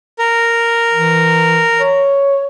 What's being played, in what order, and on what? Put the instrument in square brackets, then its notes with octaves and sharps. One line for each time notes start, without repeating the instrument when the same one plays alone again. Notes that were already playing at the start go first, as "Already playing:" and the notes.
[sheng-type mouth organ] A#4
[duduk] E3
C#5